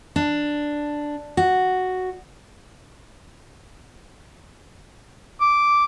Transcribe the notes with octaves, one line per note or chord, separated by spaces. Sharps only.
D4
F#4
D6